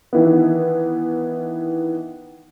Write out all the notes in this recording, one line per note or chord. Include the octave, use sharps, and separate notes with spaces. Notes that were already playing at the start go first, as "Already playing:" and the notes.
D#3 E3 B3